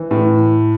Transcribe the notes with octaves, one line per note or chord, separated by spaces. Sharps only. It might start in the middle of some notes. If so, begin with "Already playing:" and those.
Already playing: E3
A2